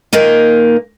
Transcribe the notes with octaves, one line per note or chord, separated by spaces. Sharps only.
A#2 D#3 A#3 D#4